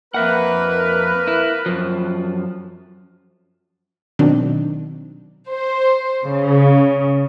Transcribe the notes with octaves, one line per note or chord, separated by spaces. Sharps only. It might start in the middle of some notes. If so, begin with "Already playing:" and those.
F2 A#3 A#4 B4 E5 F#5
E4
F#2 F3
B2 D#3 F#3 C4 D4 D#4
C5
C#3